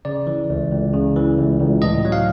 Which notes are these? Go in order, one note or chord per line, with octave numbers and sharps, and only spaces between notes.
C#3 D5
E3
C#2
C#2
C#3
E3
C#2
C#2
A2 D#5
F#3
F5